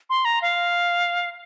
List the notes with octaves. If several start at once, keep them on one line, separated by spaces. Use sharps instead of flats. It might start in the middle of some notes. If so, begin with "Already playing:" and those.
C6
A#5
F5